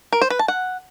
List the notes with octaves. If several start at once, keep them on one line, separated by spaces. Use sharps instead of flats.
A#4
C5
B4
A5
F#5